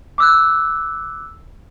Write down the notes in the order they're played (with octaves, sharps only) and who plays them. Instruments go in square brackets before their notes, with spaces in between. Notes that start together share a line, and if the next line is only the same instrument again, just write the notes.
[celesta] D6 E6 F#6